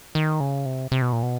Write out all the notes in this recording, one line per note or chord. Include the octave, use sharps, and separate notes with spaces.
D#3
C#3
C3
C3
B2
A#2
B2